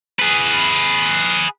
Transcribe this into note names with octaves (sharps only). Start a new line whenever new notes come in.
G#4 B4